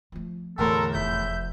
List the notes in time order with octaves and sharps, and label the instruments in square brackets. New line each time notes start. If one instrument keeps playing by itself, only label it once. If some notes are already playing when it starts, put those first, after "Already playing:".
[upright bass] F3 A3
[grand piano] E2 A2 C6 [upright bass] D3 [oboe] A4 [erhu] A#4
[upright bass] F1 [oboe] E5 [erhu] G6